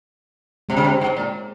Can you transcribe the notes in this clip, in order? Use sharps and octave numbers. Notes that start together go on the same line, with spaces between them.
C3 G#3
C#3
C3
G#2
A#2